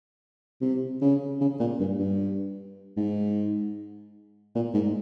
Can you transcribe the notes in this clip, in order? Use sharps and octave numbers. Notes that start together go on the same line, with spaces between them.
C3
C#3
C#3
A#2
G2
G2
G#2
A#2
G#2